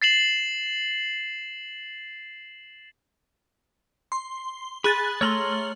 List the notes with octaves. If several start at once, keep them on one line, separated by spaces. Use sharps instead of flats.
A6 C7 E7 F#7
C6
G#4 B5 F#6 A6
A3 C#5 A#5 C6 F6 F#7